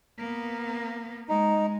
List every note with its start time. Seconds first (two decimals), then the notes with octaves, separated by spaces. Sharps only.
0.18 A#3 B3
1.29 G#3 D#4